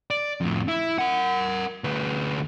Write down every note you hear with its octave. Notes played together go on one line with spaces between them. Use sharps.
D5
F2 A2
E4
A#4 F#5
D2 B4